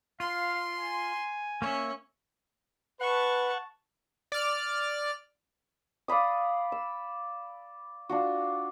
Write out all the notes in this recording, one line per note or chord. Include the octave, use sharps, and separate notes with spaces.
F4 F5 C6
G#5
A#3 C#4 C#5 E5
B4 F#5 A5 C#6
D5 F6
D5 F5 B5 D#6
E6
D4 F4 F#4